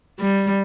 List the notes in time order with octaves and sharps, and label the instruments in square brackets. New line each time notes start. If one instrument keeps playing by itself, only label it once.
[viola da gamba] G3